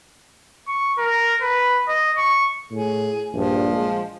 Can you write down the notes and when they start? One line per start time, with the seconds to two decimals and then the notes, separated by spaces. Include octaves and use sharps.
0.68 C#6
0.98 A#4
1.42 B4
1.88 D#5
2.17 C#6
2.71 A2 G#4
3.34 A#1 G2 F3
3.71 G#3